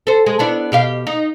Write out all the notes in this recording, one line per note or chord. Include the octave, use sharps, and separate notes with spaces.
A4 C5
G#3
B3 D4 E4
B2 G4 F5
D#4